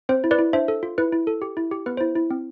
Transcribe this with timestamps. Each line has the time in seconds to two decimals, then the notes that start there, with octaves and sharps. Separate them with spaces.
0.09 C4 C5
0.24 E4
0.31 B4 D5
0.39 E4
0.53 D4 C5 E5
0.68 A4
0.83 F4
0.98 E4 B4
1.13 E4
1.27 A4
1.42 G4
1.57 E4
1.72 G4
1.86 B3 B4
1.97 E4 C5
2.16 E4
2.31 C4